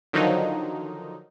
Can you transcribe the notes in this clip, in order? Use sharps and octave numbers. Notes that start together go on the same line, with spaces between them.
D3 D#3 F3 F#3 D#4